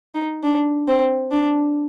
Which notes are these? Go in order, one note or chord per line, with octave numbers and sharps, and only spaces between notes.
D#4
D4
C4
D4